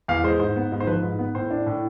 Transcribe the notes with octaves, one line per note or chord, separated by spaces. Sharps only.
E2 F5
G#3 C5
G#2 C5
B3
G#2
C5
F3 B4
G#2
B3
A2 C5
D4
A2